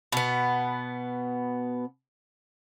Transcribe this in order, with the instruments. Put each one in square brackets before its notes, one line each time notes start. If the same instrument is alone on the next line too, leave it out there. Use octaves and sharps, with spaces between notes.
[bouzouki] B2 B3